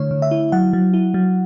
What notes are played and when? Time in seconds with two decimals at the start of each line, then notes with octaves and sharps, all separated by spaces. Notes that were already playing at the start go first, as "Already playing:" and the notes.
Already playing: D3 A3 E4 C#5
0.11 D3
0.22 E5
0.31 E4
0.52 F#3 F#5
0.73 F#3
0.94 E4
1.14 F#3